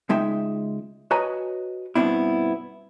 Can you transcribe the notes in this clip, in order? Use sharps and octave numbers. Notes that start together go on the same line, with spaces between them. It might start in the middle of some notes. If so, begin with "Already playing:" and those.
C#2 G#3 D#4 E5 G5
F#4 B4 C#5 D#5 G#5 A#5
G2 B2 B3 C4 D4 E4